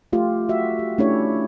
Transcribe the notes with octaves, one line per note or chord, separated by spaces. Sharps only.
A3 F4 G4
F#4 E5
G4
A3 C#4 D4 E4 G4 C#5